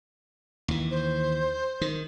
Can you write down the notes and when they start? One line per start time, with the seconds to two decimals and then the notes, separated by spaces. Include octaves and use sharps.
0.68 D#2 E3
0.91 C5
1.81 D#3